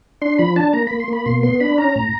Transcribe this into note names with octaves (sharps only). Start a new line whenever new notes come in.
D4 C6
F3 B5
D4 A5
A#3 A#5
A#3 B5
C6
A#3 B5
B2 C6
B3 C6
D4 B5
C#4 A#5
A2